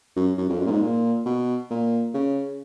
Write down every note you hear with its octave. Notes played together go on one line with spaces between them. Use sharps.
F#2
F#2
F2
F#2
A#2
G#2
A#2
B2
A#2
C#3